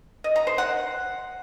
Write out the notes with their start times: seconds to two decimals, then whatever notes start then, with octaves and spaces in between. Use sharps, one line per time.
0.24 D#5
0.36 A#5
0.47 C5
0.58 F#5